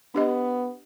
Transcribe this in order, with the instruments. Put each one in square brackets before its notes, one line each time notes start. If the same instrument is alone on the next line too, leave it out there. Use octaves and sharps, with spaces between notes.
[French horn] B3 [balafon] D4 G4 D#5